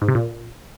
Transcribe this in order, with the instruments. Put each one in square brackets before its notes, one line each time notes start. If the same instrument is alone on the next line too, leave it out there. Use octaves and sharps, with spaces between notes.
[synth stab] G#2
C3
A#2